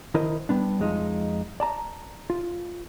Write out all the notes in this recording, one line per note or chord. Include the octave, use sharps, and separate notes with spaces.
D#3 E4 A#4 C5 D#5
G3 B3 D4
F2 G#3 D#4 F4
D5 A5 A#5
F4